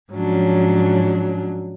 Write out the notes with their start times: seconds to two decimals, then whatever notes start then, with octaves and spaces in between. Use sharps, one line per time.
0.13 G#2 F3 F#3 C#4 D4